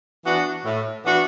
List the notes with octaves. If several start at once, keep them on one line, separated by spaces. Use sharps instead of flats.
E3 B3 D4 F#4
A2
E3 B3 D4 F#4